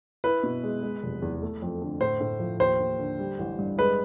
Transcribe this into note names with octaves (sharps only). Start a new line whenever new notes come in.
E4 B4
B2
G#3
G#3
F1
E2
A3
F2
D3
A2 C5
A2
F3
D#2 C5
D#2
D3
G3
A1
G2
G#3 B4